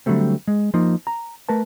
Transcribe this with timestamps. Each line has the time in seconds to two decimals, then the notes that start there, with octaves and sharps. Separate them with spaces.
0.06 D3 F#3 G3 A3 C4
0.48 G#3
0.74 F3 A#3 D#4
1.07 A#5
1.49 A3 A#4 B4 A5